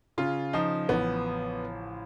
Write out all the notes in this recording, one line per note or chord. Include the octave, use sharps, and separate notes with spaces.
C#3 F4
F3 D#4
A1 B3